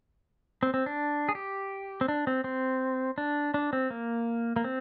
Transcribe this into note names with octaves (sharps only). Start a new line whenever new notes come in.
C4
C4
D4
G#4
G4
C4
D4
C4
C4
D4
D4
C4
A#3
A#3
C4